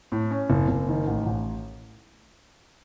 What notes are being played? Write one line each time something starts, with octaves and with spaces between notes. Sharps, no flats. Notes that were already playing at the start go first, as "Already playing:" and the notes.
A2
C#4
F#1
F#1
D#3
A1
A1